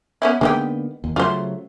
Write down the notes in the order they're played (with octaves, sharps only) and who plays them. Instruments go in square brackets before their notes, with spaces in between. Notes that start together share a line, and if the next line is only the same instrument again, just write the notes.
[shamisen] B3 C#4 E4
[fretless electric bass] D3 A#3 B3 [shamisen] G#3 D#4 G4
[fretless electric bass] D#2
[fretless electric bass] C#3 F#3 A3 [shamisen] F4 C5